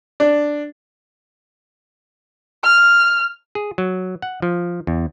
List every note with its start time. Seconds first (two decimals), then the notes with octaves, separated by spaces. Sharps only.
0.20 D4
2.64 F6
3.55 G#4
3.78 F#3
4.22 F#5
4.42 F3
4.87 E2